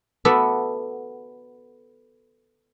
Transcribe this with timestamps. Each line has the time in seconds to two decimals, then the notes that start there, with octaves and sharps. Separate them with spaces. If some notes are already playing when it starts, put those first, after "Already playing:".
0.25 B3 F#4 A4 D5 E5 F#5